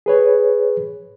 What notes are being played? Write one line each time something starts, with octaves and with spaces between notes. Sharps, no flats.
G#4 B4 C#5